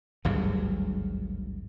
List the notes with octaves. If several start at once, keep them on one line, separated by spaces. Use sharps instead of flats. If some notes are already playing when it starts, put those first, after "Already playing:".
G#1 D2 G2 F#3